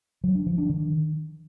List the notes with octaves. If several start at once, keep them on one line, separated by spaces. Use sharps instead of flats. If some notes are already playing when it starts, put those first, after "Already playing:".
F#3
D4
F3
D4
D#3